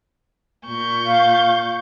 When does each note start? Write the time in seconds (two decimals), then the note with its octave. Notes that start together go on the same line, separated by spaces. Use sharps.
0.65 A#2 C#6 G6
1.06 F5